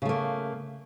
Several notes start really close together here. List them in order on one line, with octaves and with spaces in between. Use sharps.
C#3 A3 A#3